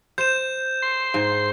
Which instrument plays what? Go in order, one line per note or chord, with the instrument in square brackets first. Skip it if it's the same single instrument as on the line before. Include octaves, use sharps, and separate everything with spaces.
[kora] C5 [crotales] G6 E7
[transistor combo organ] C6
[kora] G#2